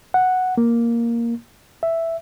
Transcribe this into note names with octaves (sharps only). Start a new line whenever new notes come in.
F#5
A#3
E5